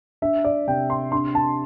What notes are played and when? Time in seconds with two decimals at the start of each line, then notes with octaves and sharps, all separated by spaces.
0.22 D4 E5
0.45 D5
0.67 C3 G5
0.90 C6
1.12 D4 C6
1.35 A5